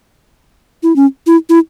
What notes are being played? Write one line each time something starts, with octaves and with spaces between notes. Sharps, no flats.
E4
C#4
E4
E4